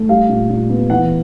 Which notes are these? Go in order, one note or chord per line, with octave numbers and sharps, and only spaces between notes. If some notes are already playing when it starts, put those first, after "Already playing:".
Already playing: A3
G3 F5
A#2
A#2
B3
E3 F#5